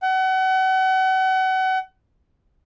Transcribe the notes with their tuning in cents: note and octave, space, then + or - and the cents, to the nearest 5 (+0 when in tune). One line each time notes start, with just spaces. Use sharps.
F#5 +30